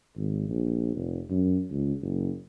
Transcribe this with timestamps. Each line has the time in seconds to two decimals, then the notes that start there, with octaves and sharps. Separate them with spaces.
0.16 G#1
0.49 A#1
0.95 F1
1.30 F#2
1.71 C#2
2.02 F#1